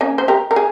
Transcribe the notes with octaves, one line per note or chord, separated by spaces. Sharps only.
A#3 C#4
C5
G4 A#4
A#4
G#4